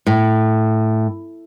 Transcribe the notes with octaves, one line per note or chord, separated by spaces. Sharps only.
A2